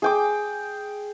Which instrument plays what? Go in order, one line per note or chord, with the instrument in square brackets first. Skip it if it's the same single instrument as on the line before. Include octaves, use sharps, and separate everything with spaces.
[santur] G#4 G5 D6